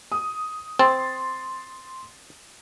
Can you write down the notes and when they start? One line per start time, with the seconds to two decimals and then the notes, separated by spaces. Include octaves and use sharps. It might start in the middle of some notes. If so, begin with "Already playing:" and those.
0.12 D#6
0.79 C4 C6 A6